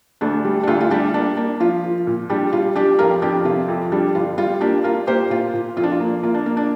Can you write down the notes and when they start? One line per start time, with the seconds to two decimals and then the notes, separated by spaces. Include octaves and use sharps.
0.21 D2 D4
0.45 G3
0.63 D4
0.67 D2 F4
0.81 F4
0.91 G3 D4 G4
1.14 A#3 D4
1.37 A#3 D4
1.60 F3 F4
1.84 F3
2.07 A#2
2.30 G3 D4 G4
2.52 G3 F4
2.75 G3 D4 G4
2.99 F2 F4 A#4
3.22 F2 D4 G4
3.45 C3 F4
3.68 F2
3.92 G3 D4
4.15 G1 F4
4.38 G3 F4
4.61 A#3 D4 G4
4.84 A#3 F4 A#4
5.07 A#3 G4 C5
5.30 A#2 F4
5.54 A#2
5.77 F2 F4
5.83 D4
5.91 F4
6.00 A#3
6.23 A#3 F4
6.34 D4
6.46 A#3
6.57 D4